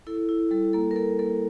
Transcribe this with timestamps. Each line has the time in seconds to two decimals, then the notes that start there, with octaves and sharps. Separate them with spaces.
0.07 E4 A4
0.29 E4
0.51 G3 A4
0.73 A#3 A4
0.91 A#4
0.96 A#3 A4
1.19 A#3 A4